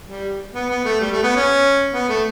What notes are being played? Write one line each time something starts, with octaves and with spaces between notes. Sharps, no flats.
G3
B3
B3
A3
G3
A3
B3
C#4
B3
A3